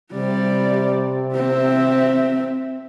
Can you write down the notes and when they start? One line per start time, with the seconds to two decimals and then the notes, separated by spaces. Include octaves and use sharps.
0.13 C3 G3 D5
1.35 C4 E5